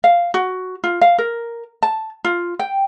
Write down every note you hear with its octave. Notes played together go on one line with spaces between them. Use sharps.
F5
F#4
F4
F5
A#4
A5
F4
G5